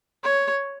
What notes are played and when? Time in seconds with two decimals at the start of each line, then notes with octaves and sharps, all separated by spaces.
0.24 C#5